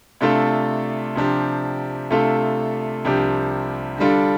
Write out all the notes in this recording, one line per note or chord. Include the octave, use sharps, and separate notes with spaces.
C3 A3 D4 F4 A4
C3 F3 D4 G4
C3 A3 D4 F4 A4
C2 C3 F3 D4 G4
D3 G3 D4 F4 A4